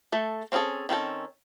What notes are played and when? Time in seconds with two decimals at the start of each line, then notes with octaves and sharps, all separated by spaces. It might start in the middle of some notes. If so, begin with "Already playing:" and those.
0.12 A3 A4
0.52 C4 C#4 F4 G#4 A4
0.89 D#3 C4 C#4 A4